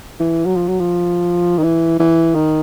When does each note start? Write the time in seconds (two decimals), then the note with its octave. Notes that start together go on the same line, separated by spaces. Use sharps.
0.20 E3
0.46 F#3
0.56 F3
0.68 F#3
0.80 F3
1.58 D#3
1.63 E3
1.99 E3
2.35 D#3